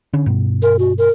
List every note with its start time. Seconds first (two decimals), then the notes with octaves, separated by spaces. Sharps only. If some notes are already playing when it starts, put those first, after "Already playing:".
0.13 D3 C#4
0.26 G2 B2
0.62 A#4
0.79 F#4
0.98 A#4